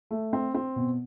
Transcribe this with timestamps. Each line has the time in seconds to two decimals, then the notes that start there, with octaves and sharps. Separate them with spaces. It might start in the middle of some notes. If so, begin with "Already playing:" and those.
0.11 A3
0.33 C4
0.54 C4
0.76 B2